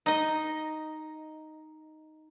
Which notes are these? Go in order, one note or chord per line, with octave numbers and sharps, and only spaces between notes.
D#4 D#5